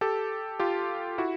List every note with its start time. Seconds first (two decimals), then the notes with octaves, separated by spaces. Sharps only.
0.01 G4 A4
0.59 F4 G4
1.18 E4 F#4